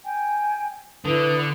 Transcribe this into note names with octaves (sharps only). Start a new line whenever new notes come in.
G5 G#5
D3 E4 B4 D#6